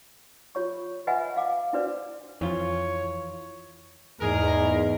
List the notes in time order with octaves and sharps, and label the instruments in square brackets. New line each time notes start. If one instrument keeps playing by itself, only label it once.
[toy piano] F4 C#5 C#6
B4 D#5 E5 F#5 G#5 B5
F5 D6
D4 E4 F#4 B4 C5 D5
[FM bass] F2 [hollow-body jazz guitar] E3 F4 [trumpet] C#5
[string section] E2 [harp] G#2 A3 D#5 [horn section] G#4 A#4